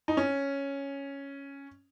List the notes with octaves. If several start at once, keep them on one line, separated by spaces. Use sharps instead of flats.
D#4
C#4